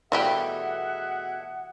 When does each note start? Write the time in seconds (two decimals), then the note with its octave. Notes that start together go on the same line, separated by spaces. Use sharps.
0.12 B2 E3 G3 A3 G4 G#4 E5 F#5